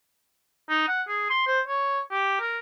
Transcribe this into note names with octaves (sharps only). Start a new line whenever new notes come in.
D#4
F#5
G#4
C6
C5
C#5
G4
A#4